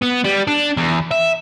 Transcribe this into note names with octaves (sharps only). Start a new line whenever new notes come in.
B3
G3
D4
E2
E5